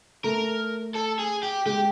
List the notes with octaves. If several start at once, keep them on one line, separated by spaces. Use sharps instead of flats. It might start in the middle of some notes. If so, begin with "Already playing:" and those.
A3 A#4
A4
G#4
G4
G#3 G4